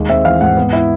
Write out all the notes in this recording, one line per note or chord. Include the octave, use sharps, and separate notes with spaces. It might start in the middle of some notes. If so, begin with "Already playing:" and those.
Already playing: D#2 G#3
C4 E5
E3 F5
G#2 F#5
B3
E4